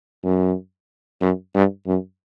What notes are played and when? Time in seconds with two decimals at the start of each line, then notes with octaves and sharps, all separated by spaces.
0.24 F#2
1.21 F#2
1.55 G2
1.87 F#2